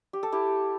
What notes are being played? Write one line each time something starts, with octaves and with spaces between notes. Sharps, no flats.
G4
A4
E4 G4